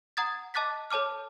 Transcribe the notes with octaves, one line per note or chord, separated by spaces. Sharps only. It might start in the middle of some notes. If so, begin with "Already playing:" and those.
F#5 A#5 D#6 G#6 A6
D#5 A5 D6 F#6 A6 B6
A4 C#5 A5 D6 F6